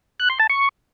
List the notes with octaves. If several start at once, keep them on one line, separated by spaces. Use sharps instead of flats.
F#6
C6
A5
C#6